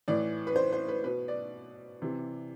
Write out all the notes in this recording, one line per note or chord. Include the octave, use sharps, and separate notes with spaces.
A2 E3 D5
B4
C5
C5
B4
B2 B4
D5
C3 E3